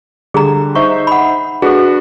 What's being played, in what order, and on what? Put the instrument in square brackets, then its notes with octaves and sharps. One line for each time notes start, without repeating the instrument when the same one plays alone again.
[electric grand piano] D3 G3 [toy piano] G#4 A#5
[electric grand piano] D#4 C5 E5 [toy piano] C#6
[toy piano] F#5 B5
[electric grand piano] D4 F#4 B4 [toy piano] G#4 A4